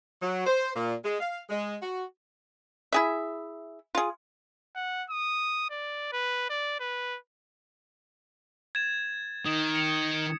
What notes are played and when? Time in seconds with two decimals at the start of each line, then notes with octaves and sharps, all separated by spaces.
0.22 F#3
0.46 C5
0.76 A#2
1.04 G#3
1.20 F5
1.49 G#3
1.82 F#4
2.93 E4 G#4 E5
3.95 F4 G#4
4.75 F#5
5.10 D#6
5.70 D5
6.12 B4
6.50 D5
6.80 B4
8.75 G#6 A6 E7
9.46 D#3 D#6 E7
9.75 C#7